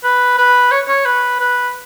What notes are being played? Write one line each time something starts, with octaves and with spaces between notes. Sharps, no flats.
B4
B4
C#5
C#5
B4
B4